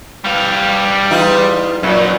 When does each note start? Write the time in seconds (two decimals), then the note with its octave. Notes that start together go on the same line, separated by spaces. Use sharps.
0.24 G3 F5
1.11 E2 D#4 F4
1.83 F#2 A#2